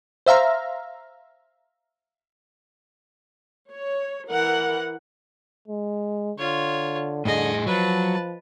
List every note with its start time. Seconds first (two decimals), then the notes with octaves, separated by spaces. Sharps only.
0.26 C5 E5 F5 A#5
3.71 C#5
4.30 E3 A#4 F#5
5.68 G#3
6.38 D3 F4 C#5
7.25 A2 D3 G#4 D#5
7.66 F3 F#3 B4 A5